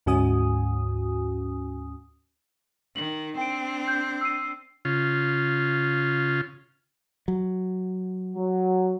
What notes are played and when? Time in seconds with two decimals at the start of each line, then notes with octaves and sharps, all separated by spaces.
0.06 D2 G#2 C#4 F#4 G#5 D#6
2.96 D#3 F#7
3.37 C4 D4 G5 D7
3.88 G6
4.21 E6 C7 D#7
4.85 C#3 F4
7.28 F#3
8.36 F#3